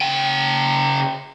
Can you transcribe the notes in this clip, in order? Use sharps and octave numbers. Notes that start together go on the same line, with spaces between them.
C#3 G5